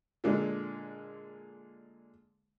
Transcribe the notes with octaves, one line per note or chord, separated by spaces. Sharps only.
A#2 D3 G#3